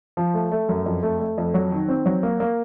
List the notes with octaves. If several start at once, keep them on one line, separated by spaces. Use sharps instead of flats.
F3
A3
A3
F#2
F2
A3
A3
F2
F#3
D#3
C4
F#3
A#3
A#3